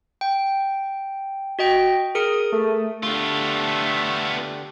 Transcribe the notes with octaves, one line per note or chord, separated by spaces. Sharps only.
G5
F#4 D#5 G5
G#4 A#4 D#6 C#7
A3
D3 A3 B3 D4 F4 G4